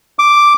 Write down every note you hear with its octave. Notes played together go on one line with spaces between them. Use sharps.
D6